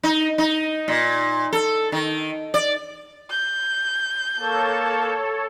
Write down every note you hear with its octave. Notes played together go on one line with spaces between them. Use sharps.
D#4
D#4
A#2
A4
D#3
D5
G6
A#3 A4 C#5 A5